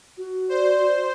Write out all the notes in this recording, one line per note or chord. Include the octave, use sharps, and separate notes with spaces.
F#4
C5 D5